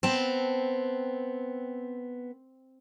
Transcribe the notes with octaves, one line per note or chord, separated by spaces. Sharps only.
B3 C4 A5